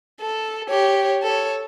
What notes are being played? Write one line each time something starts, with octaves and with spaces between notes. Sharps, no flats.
A4
G4 C#5
A4 C#5